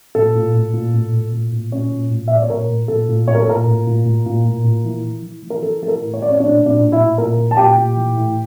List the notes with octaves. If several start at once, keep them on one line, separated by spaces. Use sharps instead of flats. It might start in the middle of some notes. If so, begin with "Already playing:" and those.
A#2 A4
A#2
A#2
A#2
A#2
A#2
A#2
A#2
A#2 C#4 C#5
A#2
A#2
E5
A#2 D5
C#5
A#2 A#4
A#2
A#2 A4
A#2
A#2 C#5
A#4
A4
A#2 A#4
A#2
A#2
A#2
A#2
A#2
A#2
E3
E3
E3
E3
A#4
E3 A4
E3 A4
A#4
A2
C#5
A2 D5
C#4 C#5
A#2 D4 D5
A#2
D4 D5
A#2
E4 E5
A#2
A#2 A#4
A#2
A5
A#2 G4 G5
A#2
E3
A2